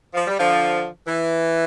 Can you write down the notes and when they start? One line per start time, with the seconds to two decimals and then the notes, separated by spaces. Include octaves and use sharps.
0.14 F3
0.27 G3
0.39 D3 F3
1.07 E3